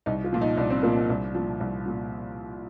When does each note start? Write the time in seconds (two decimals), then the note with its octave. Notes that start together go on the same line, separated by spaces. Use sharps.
0.06 C2 D#4
0.24 F4
0.33 A#2 F3
0.41 D#4
0.57 C2 D4
0.70 C4
0.83 A#2 F3 A#3
0.96 C4
1.09 C2 D4
1.35 A#2 F3
1.60 C2
1.86 A#2 F3